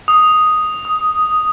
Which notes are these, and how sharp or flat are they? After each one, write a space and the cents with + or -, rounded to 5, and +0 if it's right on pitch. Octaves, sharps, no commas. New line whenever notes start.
D#6 +0
D#6 +10